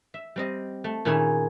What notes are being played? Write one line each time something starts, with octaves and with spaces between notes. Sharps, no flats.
E5
G3 C4 D#5
A3
A#2 D#3 C#4 E4 F4 G#4